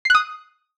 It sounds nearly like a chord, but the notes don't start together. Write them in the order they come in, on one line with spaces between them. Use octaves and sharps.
C7 F#6 D#6